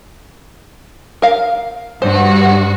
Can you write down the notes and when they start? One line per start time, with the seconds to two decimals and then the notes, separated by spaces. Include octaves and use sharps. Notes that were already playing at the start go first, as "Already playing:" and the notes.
1.22 A#4 F5
2.02 G2 F#4 C5